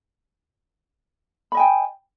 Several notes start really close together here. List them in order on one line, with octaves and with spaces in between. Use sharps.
B5 D#5 G#5 G5